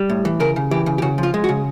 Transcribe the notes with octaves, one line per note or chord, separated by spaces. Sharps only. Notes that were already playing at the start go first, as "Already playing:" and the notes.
Already playing: G3
A2
E3
C#3 A#4
C#3
E3 G4
C#3
G4
C#3 F#4
F3
F4
G#3
F#4
C#3